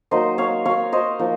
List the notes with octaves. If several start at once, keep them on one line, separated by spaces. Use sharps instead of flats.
F#3 A#3 D#4 C5 D#5
C#5 F5
C#5 F5
C5 D#5
F3 A#3 D#4